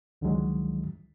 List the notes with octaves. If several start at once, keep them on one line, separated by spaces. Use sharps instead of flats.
C#2 D3 D#3 F3 F#3 G#3